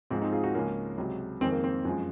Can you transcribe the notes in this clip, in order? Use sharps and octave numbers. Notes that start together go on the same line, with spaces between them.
G#2 F3 G#3 C4
C4 D#4
F4 G#4
D#4 F#4
C#2 C#3 F3 G#3 A#3 C#4
C#2 C3 F#3
F2 D#3 G#3 C4
A#3
C4
F#2 F3 G#3